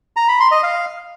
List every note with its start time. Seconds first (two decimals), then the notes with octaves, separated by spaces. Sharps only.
0.17 A#5
0.28 B5
0.40 C6
0.51 D#5
0.63 F5